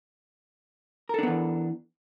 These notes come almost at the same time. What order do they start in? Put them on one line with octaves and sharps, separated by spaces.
A#4 A4 D4 B3 E3